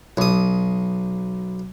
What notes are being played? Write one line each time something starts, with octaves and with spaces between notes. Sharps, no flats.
B1 D#6